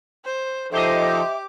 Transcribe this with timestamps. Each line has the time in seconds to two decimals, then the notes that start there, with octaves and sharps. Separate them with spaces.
0.25 C5
0.72 F3 D#4 G4 A4 C5 D#5 E5 D6